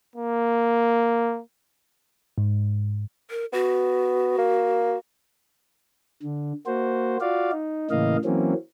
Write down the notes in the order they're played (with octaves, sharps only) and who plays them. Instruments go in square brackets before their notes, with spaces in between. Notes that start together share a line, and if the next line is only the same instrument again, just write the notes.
[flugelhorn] A#3
[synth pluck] G#2
[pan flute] A#4
[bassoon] B3 [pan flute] F#4
[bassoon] A#3
[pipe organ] D3
A#3 F#4 C5
F4 F#4 D5 F5
D#4
A2 C#3 E3 A#3 D#5 F5
E3 F#3 A#3 C4 C#4